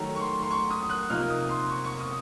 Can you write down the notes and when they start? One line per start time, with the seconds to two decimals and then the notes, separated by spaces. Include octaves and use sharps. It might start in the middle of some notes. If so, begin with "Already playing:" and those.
Already playing: D#3 F#3 A3 A#5
0.15 C#6
0.20 C6
0.42 C6
0.51 C#6
0.70 D#6
0.89 F#6
1.10 C3 F3 A#3 D#4 F6
1.30 D#6
1.49 C6
1.70 C#6
1.84 C#6
2.00 D#6